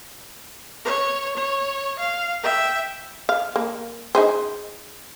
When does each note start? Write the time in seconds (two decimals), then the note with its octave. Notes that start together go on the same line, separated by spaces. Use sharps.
0.85 C#5
1.37 C#5
1.99 F5
2.43 E5 G5
3.29 F5
3.56 A#3
4.15 D#4 G#4 C5